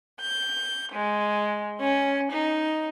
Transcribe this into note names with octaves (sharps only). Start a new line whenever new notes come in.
G6
G#3
C#4
D#4